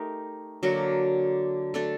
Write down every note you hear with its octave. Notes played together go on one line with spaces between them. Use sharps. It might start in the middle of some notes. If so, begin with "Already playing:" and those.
Already playing: A3 D#4 G4 A#4
D3 F#3 A#3 F#4
A3 D4 A4